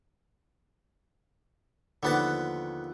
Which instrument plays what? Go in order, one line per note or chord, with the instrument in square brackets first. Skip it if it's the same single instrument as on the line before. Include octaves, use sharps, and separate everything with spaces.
[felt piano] D#2 F3 F#6 [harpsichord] D3 B3 A5